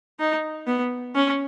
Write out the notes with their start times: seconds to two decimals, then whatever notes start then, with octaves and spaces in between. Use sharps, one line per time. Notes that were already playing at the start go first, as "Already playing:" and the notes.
0.20 D#4
0.67 B3
1.15 C#4